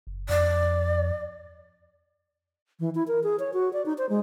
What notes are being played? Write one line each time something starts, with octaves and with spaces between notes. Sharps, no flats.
F#1
F2 D5
E3
E4
A#4
G#4
C#5
F#4
D5
D#4
C5
G#3